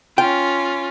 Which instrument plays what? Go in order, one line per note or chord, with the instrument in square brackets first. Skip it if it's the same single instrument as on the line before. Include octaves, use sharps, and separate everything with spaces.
[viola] C#4 F4 [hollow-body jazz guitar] G5